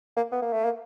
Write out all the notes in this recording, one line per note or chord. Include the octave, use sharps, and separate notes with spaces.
A#3
B3
A#3
A3
A#3